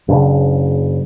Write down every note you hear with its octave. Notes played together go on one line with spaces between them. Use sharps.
F#1 C#3 D4